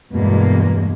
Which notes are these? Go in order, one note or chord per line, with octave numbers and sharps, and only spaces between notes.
E2 G2 B2 G#3 A#3